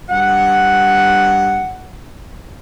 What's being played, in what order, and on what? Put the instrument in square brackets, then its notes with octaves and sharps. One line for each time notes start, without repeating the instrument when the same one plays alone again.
[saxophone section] G2 F#5